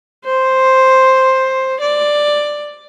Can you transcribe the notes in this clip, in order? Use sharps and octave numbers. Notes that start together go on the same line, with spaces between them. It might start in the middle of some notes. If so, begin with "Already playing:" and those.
C5
D5